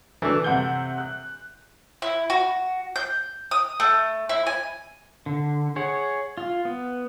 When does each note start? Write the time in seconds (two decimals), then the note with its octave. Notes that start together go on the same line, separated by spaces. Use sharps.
0.22 E3 A3 D4
0.44 C3 F#5 G6
0.98 F#6
2.02 E4
2.30 F#4
2.96 G6
3.51 D#6
3.80 A3
4.29 E4
4.47 G#5
5.26 D3
5.76 G#4 C#5 F#5
6.37 F4
6.65 B3